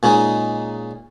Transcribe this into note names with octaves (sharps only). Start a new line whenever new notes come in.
A#2 G#3 C#4 D#4